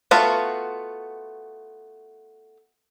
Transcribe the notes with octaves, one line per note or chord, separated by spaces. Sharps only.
A3 B3 F4 F#4